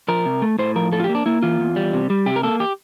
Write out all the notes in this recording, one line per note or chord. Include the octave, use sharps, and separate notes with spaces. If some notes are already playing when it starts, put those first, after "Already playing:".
F3 A#4
C3
A3
A2 C5
F3 A#4
A2 A4
F4
G4
A#3
D4
A#3 E4
E3 F4
E2
G3
C3
G3
C3 G4
A#4
A#3 A4
G4